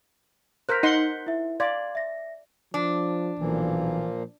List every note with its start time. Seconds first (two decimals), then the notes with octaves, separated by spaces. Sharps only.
0.69 A#4 C5 F#6 G6 B6
0.83 D#4 F#5 C6
1.27 E4 E5
1.60 D5 F5 C6 G#6
1.95 E5 A#6
2.74 F3 D4
3.39 B1 A#2 E3 F3 A#3